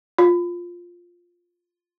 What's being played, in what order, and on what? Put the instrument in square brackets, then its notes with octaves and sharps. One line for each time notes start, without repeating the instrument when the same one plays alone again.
[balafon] F4